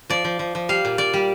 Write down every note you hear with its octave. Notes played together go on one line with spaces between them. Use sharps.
F3 D5
F3
F3
F3
G3 F5
A#2
A#2 D5
G3